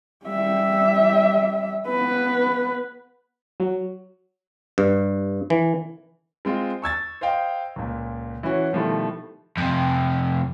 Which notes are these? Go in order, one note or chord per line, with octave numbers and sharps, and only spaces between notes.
G3 E5
B3 B4
F#3
G2
E3
G#3 C4 F4
C#6 E6 G#6 A6
C5 D#5 F5 G5
C#2 A#2
E3 C#4 F#4 C#5
B2 D#3 F3 G3 A3 E4
F2 C3